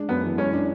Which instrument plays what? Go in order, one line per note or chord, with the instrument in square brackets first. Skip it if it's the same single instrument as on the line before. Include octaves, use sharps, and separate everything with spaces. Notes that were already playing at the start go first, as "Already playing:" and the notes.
Already playing: [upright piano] G#3 D4
[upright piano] F#2 [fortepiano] B3
[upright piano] E3
[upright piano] G#3 [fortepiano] C#4
[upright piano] D4